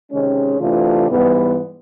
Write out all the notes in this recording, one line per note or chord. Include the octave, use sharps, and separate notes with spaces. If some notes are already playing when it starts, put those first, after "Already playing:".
C3 D#3 G#3 C#4
C3 E3 A3 D4 F4
G#2 E3 G3 B3